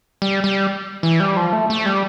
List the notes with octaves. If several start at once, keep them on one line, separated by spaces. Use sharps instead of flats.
G3
G3
E3
G3
F3
A3
A3
G3